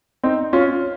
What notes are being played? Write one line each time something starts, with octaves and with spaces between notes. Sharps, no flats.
C4 D#4
C#4 F4